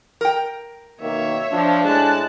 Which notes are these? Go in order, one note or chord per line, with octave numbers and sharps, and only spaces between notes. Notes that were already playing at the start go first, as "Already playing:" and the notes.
A#4 G5
B2 D#3 A#3 C#5 E5
F3 D4
A2 G#3 A5 F#6